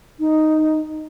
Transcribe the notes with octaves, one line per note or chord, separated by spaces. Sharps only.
D#4